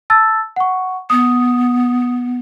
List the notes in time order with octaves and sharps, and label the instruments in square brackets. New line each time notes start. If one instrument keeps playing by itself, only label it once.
[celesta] A5 E6 A6
F#5 C#6
[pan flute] B3 [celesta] D#6